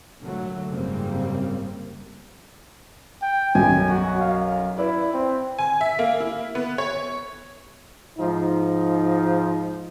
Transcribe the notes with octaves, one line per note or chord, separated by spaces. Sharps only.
A#2 D3 F#3 A3
F#1 G#2 C#3 G3 A#3 C4
G5
B1 F#2 G#5
F#4
F5
E4 B4 D5
C4
G#5
E5
A#3
E4
B3
C#5
G#2 F3 D#4